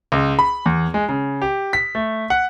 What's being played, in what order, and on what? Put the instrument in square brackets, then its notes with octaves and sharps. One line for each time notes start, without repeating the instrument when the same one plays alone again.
[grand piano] C#2
B5
E2
G#3
C#3
G4
B6
A3
F#5